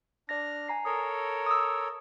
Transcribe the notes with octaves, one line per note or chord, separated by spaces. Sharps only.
D4 D5 F6 A#6
G#5 A#5 C7
A4 A#4 C#5 D#6
D#6 E6